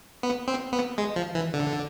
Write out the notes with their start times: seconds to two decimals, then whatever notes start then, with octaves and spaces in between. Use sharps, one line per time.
0.23 B3
0.48 C4
0.73 B3
0.98 G#3
1.16 F3
1.35 E3
1.54 D3